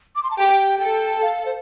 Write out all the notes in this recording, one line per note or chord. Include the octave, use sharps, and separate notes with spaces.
D6
C6
A5
G4 G5
A4 G5
F5
C5